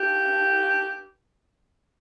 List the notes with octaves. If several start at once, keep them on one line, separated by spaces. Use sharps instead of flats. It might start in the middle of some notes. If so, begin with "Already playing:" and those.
Already playing: G4